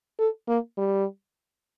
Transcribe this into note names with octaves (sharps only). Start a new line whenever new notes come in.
A4
A#3
G3